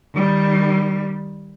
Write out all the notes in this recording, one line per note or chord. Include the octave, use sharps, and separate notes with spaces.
D#3 G3